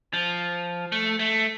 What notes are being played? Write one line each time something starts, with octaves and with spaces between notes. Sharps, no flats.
F3
A3
A3